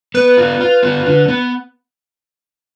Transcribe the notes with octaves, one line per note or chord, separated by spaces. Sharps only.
B3 B4
F4
F4
B3
D3
B3